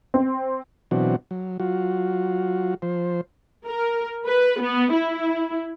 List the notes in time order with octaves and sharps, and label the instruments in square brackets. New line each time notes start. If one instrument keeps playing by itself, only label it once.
[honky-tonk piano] C4
[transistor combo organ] B2 E3 F#3 C4 D4 F#4
F#3
F#3 F4 F#4
F3 C5
[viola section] A#4
B4
B3
E4